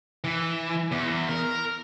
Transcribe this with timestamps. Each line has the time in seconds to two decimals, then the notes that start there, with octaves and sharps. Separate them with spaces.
0.24 E3
0.92 E2
1.29 A#4